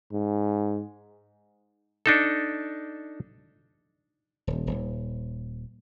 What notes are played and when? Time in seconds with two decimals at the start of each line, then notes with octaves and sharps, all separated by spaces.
0.13 G#2
2.06 D4 D#4 A4
4.47 D#1
4.67 D#1